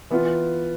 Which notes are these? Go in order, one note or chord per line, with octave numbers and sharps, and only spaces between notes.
E3 B3 F4